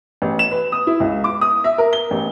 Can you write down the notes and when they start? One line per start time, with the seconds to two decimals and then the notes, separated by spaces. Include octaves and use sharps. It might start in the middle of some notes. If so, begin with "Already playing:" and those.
0.22 A1
0.39 E7
0.51 B4
0.72 D#6
0.87 E4
1.00 C#2
1.24 D6
1.41 D#6
1.64 E5
1.78 A#4
1.93 G7
2.11 A1